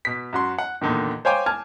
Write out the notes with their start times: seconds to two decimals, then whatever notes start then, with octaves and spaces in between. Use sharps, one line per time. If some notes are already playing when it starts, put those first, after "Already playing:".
0.05 B2 B6
0.33 F#2 F#4 C6
0.58 F#5
0.81 E2 A#2 D3 D#3
1.25 C5 C#5 F5 G5 G#5 D6
1.46 G#5 A5 F6 G#6